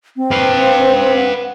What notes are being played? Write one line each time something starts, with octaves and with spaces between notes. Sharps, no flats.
C4
B4 F5
F#5